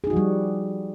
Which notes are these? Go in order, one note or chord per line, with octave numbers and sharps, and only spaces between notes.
F3 G3 D#4 F#4 G#4